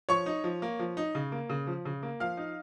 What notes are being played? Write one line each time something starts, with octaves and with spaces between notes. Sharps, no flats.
F3 C#5 C#6
D#4
F3
A#3
F3
D#4
C#3
A#3
C#3
F3
C#3
A#3
F3 F5 F6
D#4